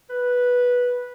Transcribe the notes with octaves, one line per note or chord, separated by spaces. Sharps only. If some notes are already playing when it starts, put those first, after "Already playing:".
B4